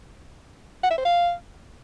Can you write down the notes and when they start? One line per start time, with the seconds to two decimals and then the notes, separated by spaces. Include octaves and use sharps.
0.83 F#5
0.91 E5
0.98 C5
1.05 F5